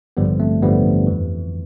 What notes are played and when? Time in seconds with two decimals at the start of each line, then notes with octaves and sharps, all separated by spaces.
0.17 A1 G2 D3 F3 G3 B3
0.40 A3 C4
0.62 A1 G2 D3 F3 G3 B3
1.07 F2 E3